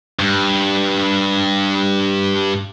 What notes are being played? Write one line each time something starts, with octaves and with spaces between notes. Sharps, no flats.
G2